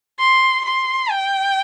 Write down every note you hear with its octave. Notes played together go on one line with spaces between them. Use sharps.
C6
C6
G5